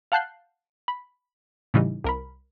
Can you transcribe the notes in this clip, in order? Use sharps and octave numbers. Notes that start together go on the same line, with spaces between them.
F5 F#5 A5 F#6 G6 C7
B5
A2 C#3 E3 G3 D#4
C2 A#4 B5